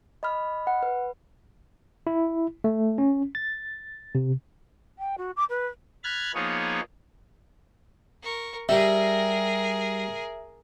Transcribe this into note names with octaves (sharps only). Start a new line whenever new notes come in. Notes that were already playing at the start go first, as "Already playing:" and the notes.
D#5 B5 F6
F#5
B4
E4
A3
C#4
A6
C3
G5
F#4
D6
B4
B5 F6 F#6 G#6 A6
F3 A#3 B3 D#4 G#4 C#5
A#4 C#6
G3 G#4 A#4 E5